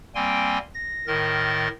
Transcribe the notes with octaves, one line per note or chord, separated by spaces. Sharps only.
G3 A#3 C4 G5 G#5 C6
A#6
A2 D#3 A#4 D#5 A6